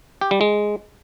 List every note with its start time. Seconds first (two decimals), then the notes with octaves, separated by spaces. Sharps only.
0.21 G4
0.31 G3
0.41 G#3